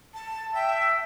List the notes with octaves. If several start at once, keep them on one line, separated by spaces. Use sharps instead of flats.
A5
E5 G5